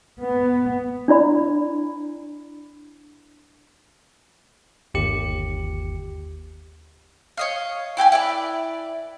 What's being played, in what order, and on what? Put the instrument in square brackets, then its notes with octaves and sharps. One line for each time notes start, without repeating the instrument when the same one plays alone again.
[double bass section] B3
[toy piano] D4 E4 D5 B5
[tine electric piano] G1 D#2 G4 C#7
[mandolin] C#5 D#5 F5
E4 G4 G5 G#5
E4 B4 D5